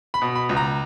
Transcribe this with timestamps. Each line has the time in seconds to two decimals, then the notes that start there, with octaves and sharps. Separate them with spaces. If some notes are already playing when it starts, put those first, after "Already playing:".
0.14 B5
0.22 B2
0.36 B5
0.49 C#2
0.57 A#5